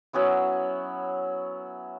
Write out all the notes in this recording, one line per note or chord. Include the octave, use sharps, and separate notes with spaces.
F#3 B3 C#4 E4